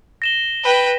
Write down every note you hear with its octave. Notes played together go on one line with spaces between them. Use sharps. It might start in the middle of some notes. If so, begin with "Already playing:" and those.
A#6 E7 G7
B4 G5